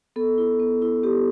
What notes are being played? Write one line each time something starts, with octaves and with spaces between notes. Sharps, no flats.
B3 A4
E4
B3
E4
B3 G4